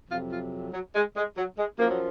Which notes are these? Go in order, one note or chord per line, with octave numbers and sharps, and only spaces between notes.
F2 C3 F#3 F4
F4
F#3
G#3
G#3
F#3
G#3
F#2 F3 A#3
F#3